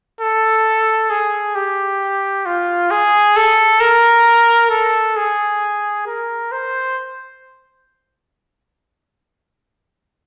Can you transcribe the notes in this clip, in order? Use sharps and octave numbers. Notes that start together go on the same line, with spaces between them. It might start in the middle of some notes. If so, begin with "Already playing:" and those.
A4
G#4
G4
F4
G#4
A4
A#4
A4
G#4
A#4
C5